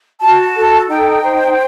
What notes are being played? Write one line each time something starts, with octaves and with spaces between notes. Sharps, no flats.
F#4 A5
A4
D#4 G5
C5